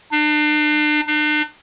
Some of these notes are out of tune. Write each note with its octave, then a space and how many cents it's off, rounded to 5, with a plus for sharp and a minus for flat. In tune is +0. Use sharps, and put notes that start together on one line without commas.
D4 +40
D4 +45